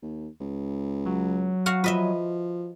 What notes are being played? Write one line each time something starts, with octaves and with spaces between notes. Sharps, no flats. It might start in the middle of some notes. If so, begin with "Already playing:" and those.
D#2
C#2
F#3
F#4 F5 F#5
F3 B4 D#5 E5